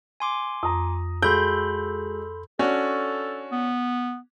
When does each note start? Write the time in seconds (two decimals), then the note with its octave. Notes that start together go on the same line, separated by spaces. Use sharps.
0.20 G#5 C6 D6
0.63 F2 A#5 D#6
1.22 G#3 F#4 A4 B5 C6 G6
2.59 C#4 D4 F#4 A4
3.52 B3